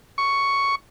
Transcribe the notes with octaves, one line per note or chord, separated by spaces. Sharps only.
C#6